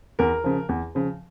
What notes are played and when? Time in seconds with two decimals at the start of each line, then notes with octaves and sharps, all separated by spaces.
0.19 E2 A#4
0.44 C#3 F3
0.69 E2
0.95 C#3 F3